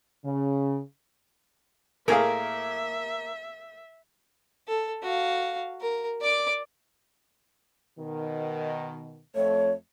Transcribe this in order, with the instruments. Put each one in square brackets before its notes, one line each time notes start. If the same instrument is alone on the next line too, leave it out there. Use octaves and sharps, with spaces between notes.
[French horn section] C#3
[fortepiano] A2 G#4 F5 [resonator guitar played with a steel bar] A#3 A#4 [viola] E5
[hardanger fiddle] A4
F#4 F5
A#4
D5 D6
[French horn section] B2 D#3
[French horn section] F2 A3 [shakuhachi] C#5